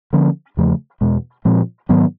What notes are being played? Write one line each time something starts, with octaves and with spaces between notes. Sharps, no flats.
D3 F3 A#3 C#4
E2 C#3 F3 A3
E2 B2 G#3
A#2 F3 G#3 C4
G#2 D#3 F#3 B3